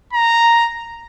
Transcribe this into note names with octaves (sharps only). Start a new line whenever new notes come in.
A#5